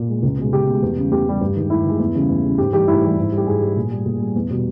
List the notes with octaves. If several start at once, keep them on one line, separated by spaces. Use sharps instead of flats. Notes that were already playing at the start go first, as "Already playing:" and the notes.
Already playing: A#2
G#3
C#2
B2 G#3
C#2 G4
B2 G#3
E2
C#3 G3
E2 G4
C#3 G3
G2
D#3 G#3
G2 E4
D#3 G#3
E2
C#3 E3 G3
E2
C#3 E3 G3
G#2 G4
E3 G3 G4
G#2 E4
E3 G3
G#2
G3
G4
G#2 G#4
G3
A#2
G3
A#2
G3
E2
B2 G3